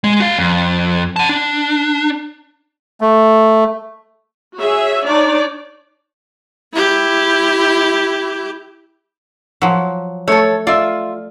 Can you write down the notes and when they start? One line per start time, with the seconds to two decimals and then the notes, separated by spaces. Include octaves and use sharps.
0.04 G#3
0.20 F#4 F5
0.39 F2
1.16 F#5 A5
1.29 D4
3.01 A3
4.58 F#4 G#4 C#5 E5
5.07 D4 D#4 C#5 D5
6.73 E4 G4
9.62 F3 F#3
10.28 A3 A4 C#5
10.67 F4 D5 E5